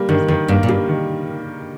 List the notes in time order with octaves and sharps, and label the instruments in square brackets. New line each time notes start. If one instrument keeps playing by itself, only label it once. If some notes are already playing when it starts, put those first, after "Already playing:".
Already playing: [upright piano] G3 A#3
[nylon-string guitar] G2 [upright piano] D#3
[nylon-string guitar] F2 [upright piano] D#3
[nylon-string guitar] G2 [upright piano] A#3
[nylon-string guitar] A#2
[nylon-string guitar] G2 [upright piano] G3
[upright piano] D#3